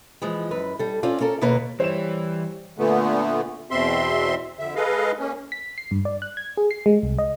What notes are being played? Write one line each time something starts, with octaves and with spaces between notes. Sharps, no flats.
E3 F3 G#3
F#2 B4
G3 A4
C4 C#4 F4 D5
C#4 A4 A#4
D#2 B2 A#3 B4 C#5 F5
E3 G3 C5 C#5 E7
A#2 D3 A3 B3
E2 B2 C4 E5 C6
F2 D3 E5
G#3 G#4 A4 B4 D#5 F5
A#3 C#4
B6
C7
G2
D5
F#6
G#6
G#4
C7
G#3
C2
D#5